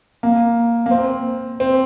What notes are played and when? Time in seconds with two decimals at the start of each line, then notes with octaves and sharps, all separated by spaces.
0.23 A#3
0.86 A#3
0.91 C4
1.60 C4